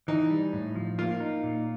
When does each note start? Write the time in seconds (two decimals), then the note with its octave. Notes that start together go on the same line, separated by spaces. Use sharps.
0.08 E3 D#4
0.30 G3
0.53 A2
0.75 F3
0.98 A#3 F4
1.20 D#4
1.43 A#2